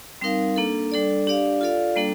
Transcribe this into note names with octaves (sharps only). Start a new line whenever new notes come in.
G3 C4 D#4 A#4 F5
A#3 D4 A4
G3 D4 A4 D5
D4 G4 D5 F5
F4 A4 D5 F5
G3 A#3 D4 A4